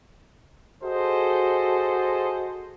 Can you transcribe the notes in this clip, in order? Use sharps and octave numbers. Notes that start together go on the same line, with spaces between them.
F#4 G#4 A4 C5 D#5